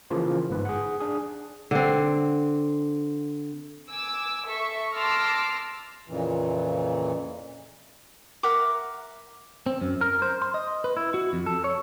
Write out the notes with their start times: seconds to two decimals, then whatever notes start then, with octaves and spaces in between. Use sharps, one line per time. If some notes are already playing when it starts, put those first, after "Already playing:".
0.10 C#3 E3 F3 A#3 F4
0.50 G1 G#2 B4
0.65 G#4 F#5
1.00 D4 G#4
1.71 D3 C4
3.90 G#5 D6 E6
4.47 A4 E5 C#6
4.94 A5 C6 D6 E6 F6 A#6
6.08 F2 A#2 C#3 E3
8.43 A#4 E5 F#5 D6
9.66 C4
9.81 F#2
10.01 A#4
10.22 C5
10.42 C6
10.54 D#5
10.84 B4
10.97 E4
11.14 F#4
11.33 F2
11.46 A4
11.64 C#5